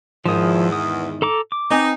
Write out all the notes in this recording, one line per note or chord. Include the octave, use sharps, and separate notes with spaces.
E2 G#2 D#3 F3 D#4 D#6
D#6
A4 A#5 D6
D6
C4 D#4 B4 G#5